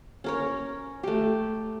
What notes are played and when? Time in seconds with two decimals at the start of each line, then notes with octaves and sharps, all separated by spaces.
0.24 C#4 A#4 C#5
1.03 A3 G4